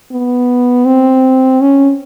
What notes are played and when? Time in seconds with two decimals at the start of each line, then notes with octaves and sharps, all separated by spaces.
0.12 B3
0.86 C4
1.61 C#4